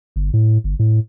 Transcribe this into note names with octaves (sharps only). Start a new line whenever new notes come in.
G1
A2
G1
A2